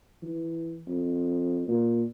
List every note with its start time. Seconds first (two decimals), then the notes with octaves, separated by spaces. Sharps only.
0.23 E3
0.87 F2
1.68 A#2